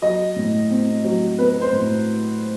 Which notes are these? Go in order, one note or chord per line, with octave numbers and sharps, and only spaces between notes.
F#3 D#5
A2
C4
F#3
C4 B4
C5
A2